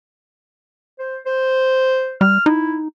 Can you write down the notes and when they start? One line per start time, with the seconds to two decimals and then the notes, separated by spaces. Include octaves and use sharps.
0.99 C5
1.26 C5
2.21 G3 F6
2.46 D#4 E4